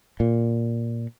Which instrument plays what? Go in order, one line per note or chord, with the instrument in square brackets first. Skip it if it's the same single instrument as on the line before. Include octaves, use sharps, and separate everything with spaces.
[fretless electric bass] A#2